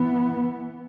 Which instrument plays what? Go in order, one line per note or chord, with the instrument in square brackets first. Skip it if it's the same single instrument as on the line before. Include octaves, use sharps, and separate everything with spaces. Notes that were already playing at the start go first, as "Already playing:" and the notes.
Already playing: [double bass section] E3 B3